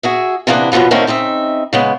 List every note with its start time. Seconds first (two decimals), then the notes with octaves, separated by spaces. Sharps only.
0.03 F#4 G#4 E5
0.47 C3 E3 A#3 B3 D4
0.72 F#2 B2 E3 F3 B3
0.91 D3 D#3 A3 A#3 C4 C#4
1.07 C#3 C4 D#4 E5
1.73 C#3 G#3 B3